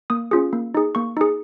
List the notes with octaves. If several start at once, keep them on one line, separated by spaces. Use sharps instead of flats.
A#3 D#6
C#4 F4 G#4
A#3
D#4 G#4
A#3 C#6
D#4 G#4